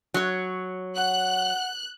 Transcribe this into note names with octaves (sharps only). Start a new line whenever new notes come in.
F#3 C#5
F#5 F#6